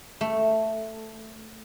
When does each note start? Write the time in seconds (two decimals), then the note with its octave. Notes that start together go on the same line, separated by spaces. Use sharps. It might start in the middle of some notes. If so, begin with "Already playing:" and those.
0.21 A3